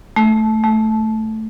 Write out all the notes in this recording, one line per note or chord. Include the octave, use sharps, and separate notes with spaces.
A3
A3